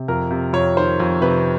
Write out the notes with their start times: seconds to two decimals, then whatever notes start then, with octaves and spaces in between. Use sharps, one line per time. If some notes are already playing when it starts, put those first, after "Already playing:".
Already playing: C3
0.08 F2 A#4
0.31 C3
0.53 F2 C#5
0.76 D#3 C5
1.00 F2
1.21 C3 B4